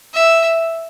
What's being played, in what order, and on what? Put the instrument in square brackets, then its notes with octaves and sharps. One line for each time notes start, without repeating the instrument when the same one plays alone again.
[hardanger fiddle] E5